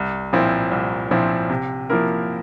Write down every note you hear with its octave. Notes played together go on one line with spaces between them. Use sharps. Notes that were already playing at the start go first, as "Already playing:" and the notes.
Already playing: C2
A#2 F3 C4 E4
C2
A#2 F3 C4 E4
C3
F3 A#3 E4 A#4